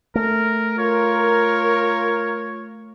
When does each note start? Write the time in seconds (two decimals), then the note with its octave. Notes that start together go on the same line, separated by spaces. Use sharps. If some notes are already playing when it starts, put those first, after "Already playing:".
0.15 A3 A#4
0.78 F4 A#4 C#5